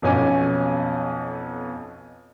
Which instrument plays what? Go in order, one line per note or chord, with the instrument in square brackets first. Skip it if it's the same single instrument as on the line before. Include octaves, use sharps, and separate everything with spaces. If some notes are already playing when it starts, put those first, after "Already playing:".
[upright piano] B1 F2 B2 C#4 G#5 D6